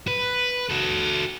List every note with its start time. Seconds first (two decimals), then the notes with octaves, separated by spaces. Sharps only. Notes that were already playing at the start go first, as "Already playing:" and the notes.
0.07 B4
0.70 F#4 A4